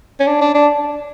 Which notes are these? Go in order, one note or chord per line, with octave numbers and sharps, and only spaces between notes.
C#4
D4
D4
D4